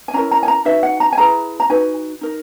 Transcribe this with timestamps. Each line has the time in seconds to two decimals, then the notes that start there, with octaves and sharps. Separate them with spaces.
0.08 G#5
0.14 C#4 E4 A#4 A#5
0.31 A#5
0.43 G#5
0.48 A#5
0.65 D#4 F#4 B4 E5
0.83 F#5
1.00 A#5
1.12 G#5
1.18 E4 G#4 B4 A#5
1.60 A#5
1.70 D#4 F#4 B4 G#5
2.21 D#4 A#4